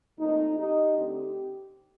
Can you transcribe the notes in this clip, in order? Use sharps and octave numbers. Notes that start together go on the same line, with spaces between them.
A#2 F3 A3 C4 D#4
D#4 G4
D3 A3 C4 D#4